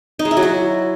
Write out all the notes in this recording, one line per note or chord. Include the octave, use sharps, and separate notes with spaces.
D#4
G#3
E4
F#3
F#4